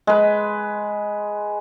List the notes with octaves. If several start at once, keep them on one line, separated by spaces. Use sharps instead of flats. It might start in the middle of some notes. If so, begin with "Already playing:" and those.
G#3 B4